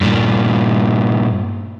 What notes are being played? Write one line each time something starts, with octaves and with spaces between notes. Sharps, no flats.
G2 A#2